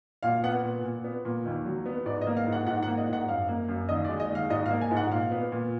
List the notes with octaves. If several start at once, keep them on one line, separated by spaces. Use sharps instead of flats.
A#2 F5
B3 F#5
A#2
A#2
B3
A#2
D#2
F#3
B3
G#2 D5
D#5
A#3
F5
G#2
F#5
G#2 F#5
F#5
A#3
D#5
G#2 F#5
F#2 F5
A#3
F#2
D#2 D#5
D5
G#3
D#5
D#2 F5
G#2 D#5
F5
A#3
G#5
G#2
F#5
A#2 F5
B3
A#2